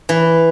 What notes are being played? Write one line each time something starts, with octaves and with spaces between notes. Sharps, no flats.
E3